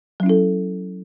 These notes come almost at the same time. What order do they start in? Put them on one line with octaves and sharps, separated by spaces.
F#3 C#4 E4 A4